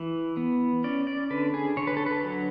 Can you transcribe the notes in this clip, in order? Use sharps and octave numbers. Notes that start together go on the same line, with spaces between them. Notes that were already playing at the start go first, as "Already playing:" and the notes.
Already playing: E3
B3
C#4 D5
D5
D3 B4
G#4
D3 C#5
B4
A4
B4
F#3